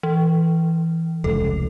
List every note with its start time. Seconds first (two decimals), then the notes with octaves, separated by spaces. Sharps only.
0.03 E3
1.24 F1 C#2 A4